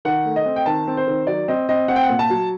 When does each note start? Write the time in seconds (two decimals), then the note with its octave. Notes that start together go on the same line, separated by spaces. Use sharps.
0.05 D#3 F#5
0.25 A3
0.36 D#5
0.46 C4
0.56 G5
0.66 D#3 A5
0.87 C4
0.97 C5
1.07 D#3
1.27 F#3 D5
1.48 C4 D#5
1.69 C4 D#5
1.88 C4 F#5
1.96 G5
2.03 F#5
2.09 A#2
2.19 A5
2.30 F#3